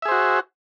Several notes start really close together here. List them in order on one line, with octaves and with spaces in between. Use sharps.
E5 G#4 C5 F#4